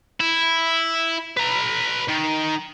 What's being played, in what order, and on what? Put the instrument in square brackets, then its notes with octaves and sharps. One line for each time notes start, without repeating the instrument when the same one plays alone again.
[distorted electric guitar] E4
B4 A#5
D#3